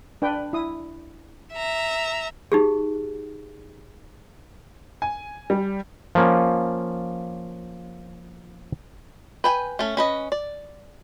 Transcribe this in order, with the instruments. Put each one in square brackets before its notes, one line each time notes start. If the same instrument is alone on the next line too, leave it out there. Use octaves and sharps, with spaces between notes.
[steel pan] D4 B4 G5
E4 D#6
[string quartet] E5 A#5
[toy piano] D#4 G4 G#4
[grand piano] G#5
G3
[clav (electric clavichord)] F3 A#3 C#4
[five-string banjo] B4 G5 G#5
A3 C#4
C#4 B4 D#5
D5